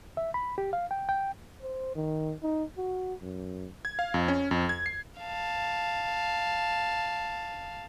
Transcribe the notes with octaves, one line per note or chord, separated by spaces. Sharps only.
E5
B5
G4
F5
G5
G5
C5
D#3
D#4
F#4
F#2
G#6
F5
F2
C#4
F2
G#6
C7
F5 A5